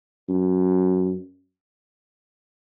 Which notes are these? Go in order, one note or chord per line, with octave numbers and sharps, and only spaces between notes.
F#2